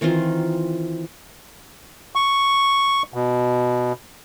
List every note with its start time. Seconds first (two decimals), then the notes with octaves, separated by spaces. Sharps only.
0.01 D#3 E3 C4 F4
2.15 C#6
3.14 B2